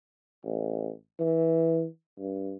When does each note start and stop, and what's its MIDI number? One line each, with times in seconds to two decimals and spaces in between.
0.44 0.91 33
1.20 1.85 52
2.18 2.56 43